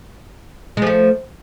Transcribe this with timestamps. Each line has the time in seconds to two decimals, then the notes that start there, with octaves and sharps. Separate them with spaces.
0.77 G#3
0.82 F3
0.87 A3